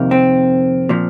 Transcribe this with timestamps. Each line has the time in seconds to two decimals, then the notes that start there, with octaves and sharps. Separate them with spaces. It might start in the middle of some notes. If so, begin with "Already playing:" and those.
Already playing: F2 C3 D#3 A#3
0.11 C4
0.89 A#2 F3